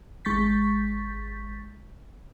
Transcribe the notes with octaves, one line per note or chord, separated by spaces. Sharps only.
G#1 G#3 C#6 G6 A6 B6